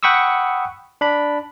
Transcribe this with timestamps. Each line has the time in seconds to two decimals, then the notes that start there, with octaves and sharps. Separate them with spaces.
0.03 F#5 G5 B5 C#6 D#6 E6
1.01 D4 B5